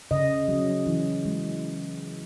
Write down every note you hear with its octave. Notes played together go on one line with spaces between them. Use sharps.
C#3 D#5
F#3 C#4
E3
G#3